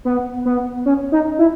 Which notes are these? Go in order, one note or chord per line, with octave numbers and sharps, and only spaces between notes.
B3
B3
C#4
D#4
E4